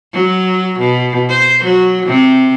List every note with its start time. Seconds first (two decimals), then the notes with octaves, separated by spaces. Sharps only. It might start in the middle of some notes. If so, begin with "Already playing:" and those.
0.13 F#3
0.79 B2
1.29 C5
1.64 F#3
2.06 C3